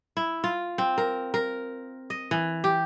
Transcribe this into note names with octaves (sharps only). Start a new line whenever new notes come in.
E4
F4
C4
A#4
A#4
D#5
E3
G4